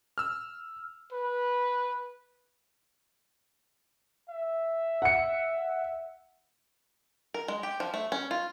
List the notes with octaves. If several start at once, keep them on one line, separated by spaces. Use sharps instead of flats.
E6 F6
B4
E5
F#5 C#7
A#4
G#3
G4
F3
A3
C#4
F4